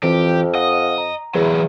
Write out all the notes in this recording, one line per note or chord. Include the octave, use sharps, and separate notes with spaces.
F2 E3 C4 F4 G4
D#5 F5 F#5 D#6
A#5
E2 E3 F#3